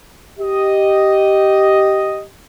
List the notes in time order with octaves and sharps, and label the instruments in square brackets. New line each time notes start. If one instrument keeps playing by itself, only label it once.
[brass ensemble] G4 D#5